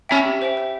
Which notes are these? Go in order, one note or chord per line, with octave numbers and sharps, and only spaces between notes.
C#4 E5 G5 B5 E6
G4
C5 E5 G5
C5